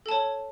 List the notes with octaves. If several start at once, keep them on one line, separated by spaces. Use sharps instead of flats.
A4 C#5 A5